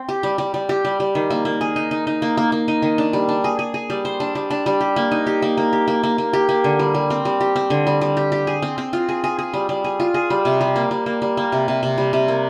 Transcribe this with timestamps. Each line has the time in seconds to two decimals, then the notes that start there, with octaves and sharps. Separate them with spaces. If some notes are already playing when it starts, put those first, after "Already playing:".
Already playing: C4
0.09 G4
0.23 G3
0.38 G3
0.54 G3
0.69 G4
0.85 G3
1.00 G3
1.15 D#3
1.30 A#3
1.45 A#3
1.61 G#4
1.76 D#4
1.91 D#4
2.07 D#4
2.22 A#3
2.37 A#3
2.52 A#3
2.68 D#4
2.82 D#3
2.98 D4
3.13 G3
3.29 D4
3.44 G#4
3.59 G#4
3.74 G#4
3.90 G3
4.05 C5
4.20 D4
4.35 G3
4.50 D4
4.66 G3
4.81 G4
4.96 A#3
5.11 D#4
5.26 G4
5.42 A#3
5.57 A#3
5.73 G4
5.88 A#3
6.03 A#3
6.18 A#3
6.33 G4
6.49 A#3
6.64 D3
6.79 G3
6.94 G3
7.10 C4
7.25 G3
7.41 G4
7.56 C4
7.70 D3
7.87 G3
8.01 G3
8.17 G4
8.32 G4
8.47 G#4
8.62 C4
8.78 C4
8.93 F4
9.09 G#4
9.24 G#4
9.39 G#4
9.53 G3
9.69 G3
9.84 G#4
10.00 F4
10.14 G#4
10.30 G3
10.45 C3
10.61 G3
10.76 A#3
10.91 G3
11.06 A#3
11.22 G3
11.37 A#3
11.52 C3
11.68 C3
11.83 C3
11.98 G3
12.13 C3
12.28 A#3